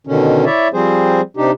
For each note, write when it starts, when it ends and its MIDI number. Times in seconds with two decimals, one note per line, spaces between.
0.07 0.45 47
0.07 0.45 50
0.07 0.45 51
0.07 0.45 61
0.45 0.68 64
0.45 0.68 73
0.45 0.68 74
0.45 0.68 76
0.73 1.21 53
0.73 1.21 55
0.73 1.21 60
0.73 1.21 68
0.73 1.21 72
1.37 1.51 48
1.37 1.51 62
1.37 1.51 63
1.37 1.51 67